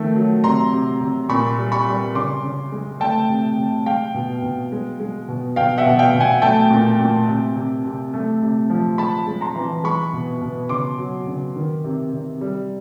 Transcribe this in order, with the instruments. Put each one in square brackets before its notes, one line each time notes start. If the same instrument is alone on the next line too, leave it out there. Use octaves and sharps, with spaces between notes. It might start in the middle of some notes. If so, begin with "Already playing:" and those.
Already playing: [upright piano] D#3 F3 A3
F#3
C3 A#5 C6
C3
C3
A#2 B5 C#6
G3
B5 C#6
G3
C#3 C6 D6
C#3
G#3
A3 G5 A5
C3
C3
G#3 F5 G5
B2
B2
G#3
G#3
B2
B2 F5 G5
E5 F#5
B2
F5 G5
B2
F#5 G#5
A3 G5 A5
A#2
A#2
C3
C3
C3
A3
C3
F3
G#3 A5 B5
G#3
A#5 C6
E3
G#3 B5 C#6
B2
B2
C#3 C6 D6
F#3
C#3
D#3
C3
C3
G3